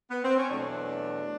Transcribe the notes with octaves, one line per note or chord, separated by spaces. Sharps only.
B3
C4
C#4
E2 B2 F#3 A3 D4